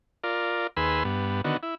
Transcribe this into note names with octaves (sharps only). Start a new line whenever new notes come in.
F4 A#4 D5
D#2 G#4 B4 B5 C6 E6
G2 B3
D3 D#3 B3 F#4
E4